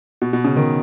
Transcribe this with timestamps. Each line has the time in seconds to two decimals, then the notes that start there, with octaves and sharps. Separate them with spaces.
0.22 B2
0.33 B2
0.45 C#3
0.56 D#3